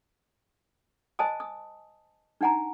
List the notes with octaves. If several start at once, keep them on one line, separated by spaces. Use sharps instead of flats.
C5 D#5 G#5 A5 D#6
D#6
D4 D#4 F#5 G#5 A#5